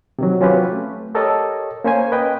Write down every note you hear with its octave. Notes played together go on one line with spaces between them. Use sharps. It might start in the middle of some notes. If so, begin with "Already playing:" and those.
C3 D#3 F#3
F#3 C4 C#4 F4 G4 B4
A3
G4 A4 A#4 C#5 D#5
A#3 C#4 C5 C#5 G#5
B4 D#5 G5